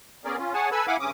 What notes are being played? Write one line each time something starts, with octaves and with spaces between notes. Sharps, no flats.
B3 C#4 G#4 A#4 D5
C#4 F4
G#4 C#5 F#5 G#5 A5
A4 B4 G#5 B5 E6
E4 F5 F#5 G#5 B5 D6
G2 C#3 C#4 D6 D#6